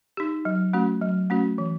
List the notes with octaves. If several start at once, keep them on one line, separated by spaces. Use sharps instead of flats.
D#4 G4
F#3
A3 C#4 F#4
F#3
A3 C#4 F#4
E3